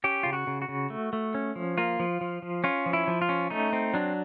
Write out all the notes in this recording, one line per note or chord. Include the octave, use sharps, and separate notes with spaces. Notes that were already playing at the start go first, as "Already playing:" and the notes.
C#4 G4
C#3 F4
F#4
C#3
F#4
C#3
A3
A3
C#4
F3
A#3 F4
F3
F3
F3
C#4 F4
F3
E4
F3
F4
C#4
A3 D#4
C4
F#3 D4